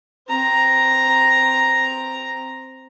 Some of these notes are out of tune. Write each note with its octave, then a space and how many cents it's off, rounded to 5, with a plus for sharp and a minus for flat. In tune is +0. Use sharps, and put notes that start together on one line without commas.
C4 +0 A#5 +0